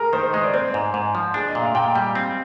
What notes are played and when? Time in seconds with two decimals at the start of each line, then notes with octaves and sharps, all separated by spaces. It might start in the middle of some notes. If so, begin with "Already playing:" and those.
Already playing: G#4 A#4
0.13 D#3 C5
0.23 C5
0.33 G#3 D#5
0.44 D5
0.54 C4 C5
0.74 G#2
0.94 G#2
1.15 F3
1.34 D4 G#4
1.48 D#5
1.55 A#2
1.62 F5
1.75 A#2 G5
1.96 G3
2.15 C4